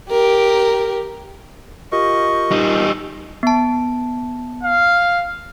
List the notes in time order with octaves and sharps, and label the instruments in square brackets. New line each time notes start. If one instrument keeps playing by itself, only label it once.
[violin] G4 A#4
[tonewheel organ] F4 G4 A#4 [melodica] D#5 C#6
[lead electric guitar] G3 D#4
[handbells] B3 A5
[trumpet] F5